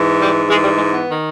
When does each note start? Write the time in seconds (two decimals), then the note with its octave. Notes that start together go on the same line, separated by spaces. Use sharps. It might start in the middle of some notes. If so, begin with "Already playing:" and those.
Already playing: G#2 E3
0.20 G3
0.49 E3 G#3
0.52 G#2
0.63 G3
0.77 G#3
0.92 B3
1.08 D#3